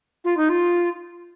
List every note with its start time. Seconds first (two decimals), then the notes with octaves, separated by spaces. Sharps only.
0.24 F4
0.37 D#4
0.49 F4